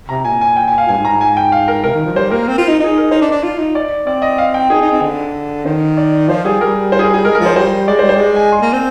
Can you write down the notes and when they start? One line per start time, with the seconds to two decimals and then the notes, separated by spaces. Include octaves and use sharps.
0.09 C3 A#5
0.25 A#2 G#5
0.41 G#5
0.57 G5
0.67 G#5
0.78 F5
0.88 G2 G#5
0.99 G#2
1.05 A#5
1.10 G#2
1.21 G#5
1.37 G5
1.52 F5
1.68 A#4
1.84 C3 A#4
1.94 D#3
2.06 F3
2.15 G3 C5
2.31 A#3 A#4
2.48 C4
2.58 F4
2.68 D#4
2.79 D#4 G#4
2.97 A#4
3.11 D#4 C5
3.22 D4
3.32 D4
3.43 F4
3.59 D#4
3.75 D5
4.06 C4 D5
4.22 D#5
4.38 F5
4.54 G5
4.70 D#4 G#4
4.81 D#4
4.92 C4
5.02 D3
5.66 D#3 C5
5.97 D5
6.29 F3 C5
6.45 G3 G#4
6.61 G3 A#4
6.92 C5
6.99 G#4
7.03 A#4
7.14 G#4
7.25 G#3 A#4
7.35 A#4
7.40 F3
7.46 C5
7.56 G3 C5
7.88 G#3 D5
7.99 C5
8.02 G3
8.09 C5
8.16 G#3 D5
8.36 G#5
8.52 C6
8.62 A#3
8.73 C4